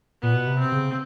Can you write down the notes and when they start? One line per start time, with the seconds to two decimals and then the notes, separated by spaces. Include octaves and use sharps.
0.22 A#2 B3
0.34 B2
0.47 C3
0.59 C4
0.72 C#3